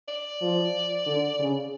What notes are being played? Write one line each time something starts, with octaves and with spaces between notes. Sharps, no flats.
D5
F3
D3
C#3